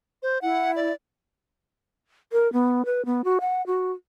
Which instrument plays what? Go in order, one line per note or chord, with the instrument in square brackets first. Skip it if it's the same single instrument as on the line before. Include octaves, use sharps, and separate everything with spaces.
[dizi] C5
[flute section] E4 [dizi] F#5
[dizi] D5
[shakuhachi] A#4
B3
B4
B3
F#4
F#5
F#4